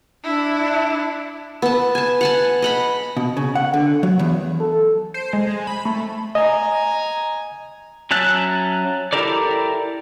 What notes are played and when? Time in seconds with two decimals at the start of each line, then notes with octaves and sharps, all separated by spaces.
0.24 D4 E4
1.62 B3 A5
1.95 G#5 A5
2.21 F#5 G#5 A5
2.62 D#5 F#5 B5
3.17 B2
3.37 C#3
3.55 F#5
3.73 D3
4.03 F#3
4.19 E2
4.60 A4
5.14 C5
5.33 G#3
5.47 G#3
5.67 B5
5.85 A3
6.35 D#5 G#5 A#5
8.11 F#3 C#4 E5 A5 F#6
9.13 E4 G4 A4 A#4 D5